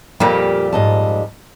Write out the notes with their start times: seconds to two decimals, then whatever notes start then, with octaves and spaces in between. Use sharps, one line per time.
0.20 F2 A#2 G3 A#3 G4
0.73 G#2 D#5 A5